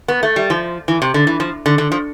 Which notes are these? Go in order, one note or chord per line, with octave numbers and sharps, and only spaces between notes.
B3
A3
G3
F3
E3
C3
D3
E3
F3
D3
D3
F3